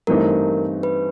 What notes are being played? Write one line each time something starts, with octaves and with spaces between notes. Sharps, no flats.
G2 E3 A3 C4 D#4 A#4
B4